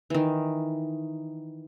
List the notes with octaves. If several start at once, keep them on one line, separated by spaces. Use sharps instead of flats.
D#3 E3